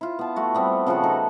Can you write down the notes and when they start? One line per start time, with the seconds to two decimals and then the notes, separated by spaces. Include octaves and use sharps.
0.01 E4 F4
0.19 B3 A5
0.36 A3 F#4
0.55 G3 B3 C4
0.86 C#3 F3 F#4 F#5
1.03 D#4 F#4 A4